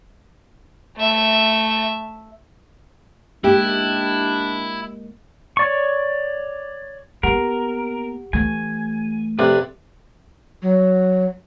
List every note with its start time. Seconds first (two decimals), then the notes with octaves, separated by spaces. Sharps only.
0.97 A3 E5
3.44 G#3 A#3 D4 E4 G4
5.57 C#5 D5 C#6
7.23 A#3 B3 G4 A#4 F#5
8.33 E3 A3 G#5
9.39 F2 C3 B4 D5 D6 F#6
10.62 F#3